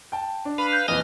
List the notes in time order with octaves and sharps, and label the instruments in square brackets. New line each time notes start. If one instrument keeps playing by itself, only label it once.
[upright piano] G5 A5
D4
[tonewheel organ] B4 F5 [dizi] B5
[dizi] G6
[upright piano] D#1 F2 E3 [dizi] B4 [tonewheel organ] D#5 D#6 F6